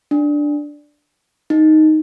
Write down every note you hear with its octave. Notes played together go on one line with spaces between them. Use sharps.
D4
D#4